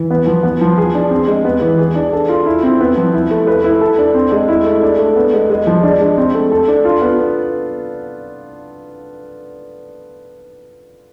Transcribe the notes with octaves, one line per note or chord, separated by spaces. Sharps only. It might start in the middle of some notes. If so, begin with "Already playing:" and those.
Already playing: E3
B3
F3
B3
F3
G#4
D4
C4
G#3
B3
E3
G#4
D4
A4
F4
E4
C4
B3
F3
E4
A3
B4
E4
A4
D4
C4
G#3
E4
A3
D4
A3
B3
G#3
G#3
F3
D4
G#3
C4
A3
A4
D4
F4
B3